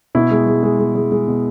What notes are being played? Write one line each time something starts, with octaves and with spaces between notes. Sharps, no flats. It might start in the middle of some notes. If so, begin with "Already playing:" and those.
B2 E4
G#3
G#3
G#3
G#3
G#3
G#3
B2